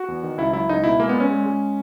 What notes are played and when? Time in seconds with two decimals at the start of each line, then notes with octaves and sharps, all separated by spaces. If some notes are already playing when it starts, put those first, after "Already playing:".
Already playing: F#4
0.08 E2
0.23 D#3
0.38 C#2 E4
0.53 F#3 E4
0.69 C#2 D#4
0.84 B2 E4
1.00 G#3 A#3
1.09 A#2 B3
1.20 C#4
1.30 G#3
1.46 G#3